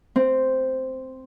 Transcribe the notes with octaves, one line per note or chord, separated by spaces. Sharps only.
C4